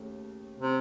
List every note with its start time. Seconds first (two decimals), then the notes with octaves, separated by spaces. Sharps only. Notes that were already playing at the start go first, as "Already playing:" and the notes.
Already playing: D#2 C#3 A3
0.60 C3